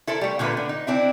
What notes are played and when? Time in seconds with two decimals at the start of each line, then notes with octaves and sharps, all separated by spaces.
0.07 E4 A4 A#4 C5
0.21 G3 A3
0.39 A#2 D3 E3 A3 A#3 B4
0.57 D3
0.69 D#4
0.87 C4 D4 E4